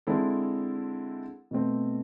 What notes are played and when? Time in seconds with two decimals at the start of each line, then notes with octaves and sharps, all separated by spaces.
0.07 D3 G#3 C4 E4 A4
1.51 B2 A3 C4